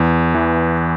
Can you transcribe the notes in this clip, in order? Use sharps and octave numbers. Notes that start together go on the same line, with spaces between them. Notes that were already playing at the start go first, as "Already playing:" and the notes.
Already playing: E2
E3